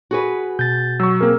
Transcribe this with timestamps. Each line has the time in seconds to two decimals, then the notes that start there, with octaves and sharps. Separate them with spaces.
0.11 F#4 G#4 B4
0.59 B2 G6 A6
1.00 F#3 C#6 E6
1.21 A#3 C4 G#4 A#4